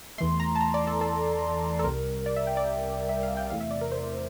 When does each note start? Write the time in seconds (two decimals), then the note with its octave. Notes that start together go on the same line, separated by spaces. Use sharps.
0.18 E2 E3 A3 C6
0.40 A#5
0.55 A5
0.61 A#5
0.74 D5
0.87 A4
1.01 A4
1.79 A4
1.84 C2 C3 G3 A#4
2.26 D5
2.36 E5
2.47 G5
2.57 D5
3.09 E5
3.23 F5
3.37 G5
3.50 E2 C3 E3 A3 F5
3.61 E5
3.71 D5
3.81 A#4
3.91 C5